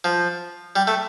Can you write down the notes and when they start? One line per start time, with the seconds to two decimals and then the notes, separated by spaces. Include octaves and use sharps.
0.04 F3
0.76 G3
0.87 A3